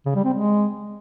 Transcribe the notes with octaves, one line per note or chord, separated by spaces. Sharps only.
C#3
G3
C4
G#3